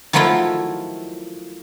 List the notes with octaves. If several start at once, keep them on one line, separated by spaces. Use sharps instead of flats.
D#3 F3 F#3 A3 E4 F4